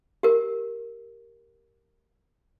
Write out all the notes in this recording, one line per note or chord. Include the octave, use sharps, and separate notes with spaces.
G4 A#4